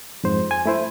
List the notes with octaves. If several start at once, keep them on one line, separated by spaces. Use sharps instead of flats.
F2 G#2 C5
G#5
A3 E4 C5